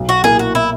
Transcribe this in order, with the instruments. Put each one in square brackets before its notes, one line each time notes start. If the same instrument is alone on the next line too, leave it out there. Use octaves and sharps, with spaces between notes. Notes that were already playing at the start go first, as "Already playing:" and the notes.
Already playing: [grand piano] B1
[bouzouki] F#4
[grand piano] A#2 A#3 E4 [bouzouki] G#4
[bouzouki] F#4
E4